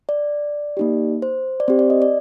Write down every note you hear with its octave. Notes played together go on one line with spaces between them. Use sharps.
D5
A#3 D#4 G4
C5
D5
C4 G4 C5
D5
D#5
D5